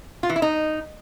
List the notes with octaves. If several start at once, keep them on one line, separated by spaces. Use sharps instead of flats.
F4
E3
E4
D#4